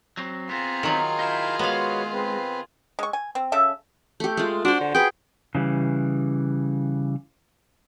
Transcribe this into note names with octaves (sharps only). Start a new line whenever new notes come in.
F#3 C4
B3 C4 F4 G#4 A#5
D#3 F#3
D#4 E4 F5 B5 G6
G#3 B3 F#4 B4 C#5 F5
C4 B4
G#3 C#6
G#5
C4
C#3 A4 E5
A3 G4
G#3 A3 F4
D4 F#4 C5
D3
G#4 B4 G5
C#3 E3 G3